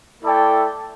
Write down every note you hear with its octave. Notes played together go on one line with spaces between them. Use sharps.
A3 E4 A4 D5 G5